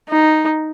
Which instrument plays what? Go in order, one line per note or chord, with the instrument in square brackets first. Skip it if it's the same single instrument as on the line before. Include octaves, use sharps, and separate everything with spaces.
[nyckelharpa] D#4